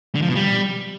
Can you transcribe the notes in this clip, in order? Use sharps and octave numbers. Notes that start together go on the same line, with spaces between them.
D3
F3
B2
G3